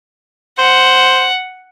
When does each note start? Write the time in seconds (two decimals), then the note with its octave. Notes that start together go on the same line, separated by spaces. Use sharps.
0.59 C5 F#5